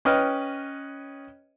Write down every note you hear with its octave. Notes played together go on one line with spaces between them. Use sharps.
C#4 B4 D#5 G5 F6